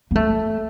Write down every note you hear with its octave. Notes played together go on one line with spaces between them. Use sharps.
A#3
A3